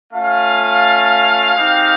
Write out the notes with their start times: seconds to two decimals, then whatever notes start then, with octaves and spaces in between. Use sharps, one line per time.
0.12 A3 C#4 F4 F5
1.55 G#3 C4 D#4 G4